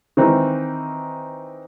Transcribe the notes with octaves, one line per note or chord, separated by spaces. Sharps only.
D#3 E3 C4 D#4